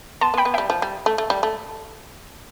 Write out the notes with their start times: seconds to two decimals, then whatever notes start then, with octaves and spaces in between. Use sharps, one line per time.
0.21 B3 A5 C6
0.34 B3
0.37 G5 B5
0.45 B3
0.54 G3 E5 G5
0.70 F3
0.82 G3
1.06 A3
1.18 A3
1.30 G3
1.43 A3